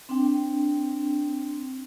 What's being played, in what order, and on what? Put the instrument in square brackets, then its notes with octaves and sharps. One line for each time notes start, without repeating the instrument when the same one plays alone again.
[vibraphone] C4 D4 G5